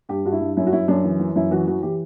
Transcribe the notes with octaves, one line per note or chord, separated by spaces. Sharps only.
G2 G4
G2 F#4
E4
G2
F#2 E4
F#4
F#2 E4
F#2 D4
E3
E3
F#2 E4
E3 F#4
E3 F#4
E3 G4